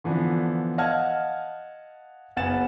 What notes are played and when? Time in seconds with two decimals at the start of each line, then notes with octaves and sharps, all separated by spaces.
0.04 D3 E3 F3 B3 D4
0.78 D#5 F5 F#5 A5 F6 G#6
2.36 F#1 B3 F#5 G#5 A6 E7